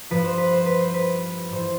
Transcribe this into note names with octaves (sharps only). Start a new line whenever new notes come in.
G2 F3 B4
C5
B4
C5
B4
C5
B4
G2 E3 C5